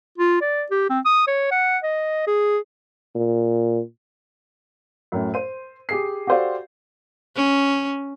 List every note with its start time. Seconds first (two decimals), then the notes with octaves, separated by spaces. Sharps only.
0.18 F4
0.41 D5
0.71 G4
0.90 C4
1.06 D#6
1.27 C#5
1.51 F#5
1.83 D#5
2.27 G#4
3.15 A#2
5.12 F#2 A2 C#4
5.34 C5 D#7
5.89 G4 G#4 C7
6.27 F#4 G4 A4 C5 D5 F5
7.36 C#4